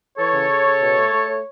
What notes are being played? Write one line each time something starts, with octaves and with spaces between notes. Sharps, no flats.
E3 A4 C#5
C#3
C#3
C#3
B2
A3
A3
A3